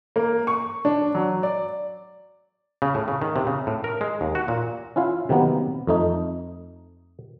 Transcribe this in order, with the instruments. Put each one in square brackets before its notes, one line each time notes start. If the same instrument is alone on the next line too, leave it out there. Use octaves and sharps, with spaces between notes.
[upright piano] A#3
C#6
D4
F#3
D5
[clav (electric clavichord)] C#3
A2
C#3
D#3
C3
C#3
A2
A#4
G#3
D#2
F#4
A#2
C#4 E4 F4 F5
C3 D#3 F#3 A#3 B3
F2 A3 D#4